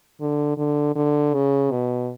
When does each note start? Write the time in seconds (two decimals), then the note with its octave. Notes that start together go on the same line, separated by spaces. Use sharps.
0.21 D3
0.57 D3
0.96 D3
1.34 C#3
1.71 B2